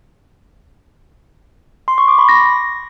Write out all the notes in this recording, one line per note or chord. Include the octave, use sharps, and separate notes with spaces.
C6
C#6
D6
B5
A#6